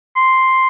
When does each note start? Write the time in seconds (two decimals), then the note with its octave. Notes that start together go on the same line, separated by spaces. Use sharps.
0.17 C6